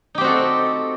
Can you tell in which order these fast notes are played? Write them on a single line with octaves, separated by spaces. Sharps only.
D#4 G4 C4 F#4 A4